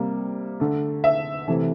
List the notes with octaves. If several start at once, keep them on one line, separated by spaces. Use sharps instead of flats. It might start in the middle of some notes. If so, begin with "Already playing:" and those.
Already playing: C3 G3 A#3
D3 A3
E5
C3 E3 A3